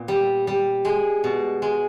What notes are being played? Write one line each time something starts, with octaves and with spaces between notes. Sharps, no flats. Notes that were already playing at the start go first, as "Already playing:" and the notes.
Already playing: A#2 B3
G3
G3
G#3
B2
G#3